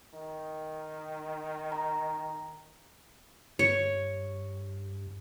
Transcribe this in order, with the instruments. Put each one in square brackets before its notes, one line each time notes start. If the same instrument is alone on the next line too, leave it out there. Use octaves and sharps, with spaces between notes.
[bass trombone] D#3
[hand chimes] A#5
[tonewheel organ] G2 [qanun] C#5